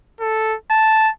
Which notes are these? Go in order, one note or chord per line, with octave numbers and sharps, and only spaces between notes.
A4
A5